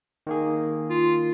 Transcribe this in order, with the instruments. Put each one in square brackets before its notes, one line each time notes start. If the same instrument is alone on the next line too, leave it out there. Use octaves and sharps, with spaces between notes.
[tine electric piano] D#3 A#3 G#4
[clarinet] F4